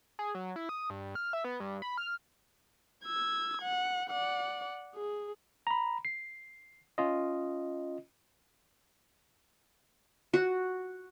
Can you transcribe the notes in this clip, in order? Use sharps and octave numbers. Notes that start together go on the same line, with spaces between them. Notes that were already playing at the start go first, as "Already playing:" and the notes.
G#4
F#3
E4
D#6
G2
F6
E5
B3
G2
B5
F6
E6 G#6
F#5
D5 F#5
G#4
A#5 B5
C7
C#4 F4 D#5
F#4